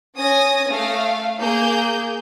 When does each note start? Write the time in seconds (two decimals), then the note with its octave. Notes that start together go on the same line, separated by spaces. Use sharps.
0.17 C#4 G#5 D#6 A#6
0.69 A3 F5
1.40 A#3 G#4 G6